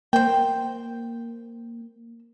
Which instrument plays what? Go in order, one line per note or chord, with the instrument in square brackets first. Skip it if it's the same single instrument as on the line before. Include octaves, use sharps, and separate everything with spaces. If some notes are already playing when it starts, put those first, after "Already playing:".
[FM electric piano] A#3 [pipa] C5 G5